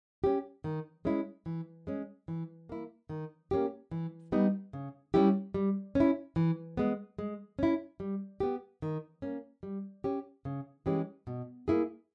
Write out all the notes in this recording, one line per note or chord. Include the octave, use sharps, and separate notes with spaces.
C#4 G4
D#3
G#3 C#4 E4
E3
G#3 C#4
E3
A#3 E4
D#3
A#3 C#4 G4
E3
G3 B3 D#4
C#3
G3 C#4 E4 G4
G3
C#4 E4
E3
G#3 B3
G#3
C#4 E4
G3
B3 G4
D#3
A#3 C#4
G3
C#4 G4
C#3
E3 G#3 C#4 G4
B2
A#3 E4 G#4